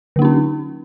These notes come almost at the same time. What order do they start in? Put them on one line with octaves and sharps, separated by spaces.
D3 A#3 D#4 C#4